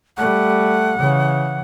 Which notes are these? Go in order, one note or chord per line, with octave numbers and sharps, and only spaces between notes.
G3 A3 F#5
C#3 E3